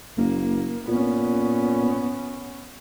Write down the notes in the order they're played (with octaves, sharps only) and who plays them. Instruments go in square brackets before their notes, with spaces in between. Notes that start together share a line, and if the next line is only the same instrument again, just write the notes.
[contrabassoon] F#1 [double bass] A#3
[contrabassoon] A#2 [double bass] B3 C#4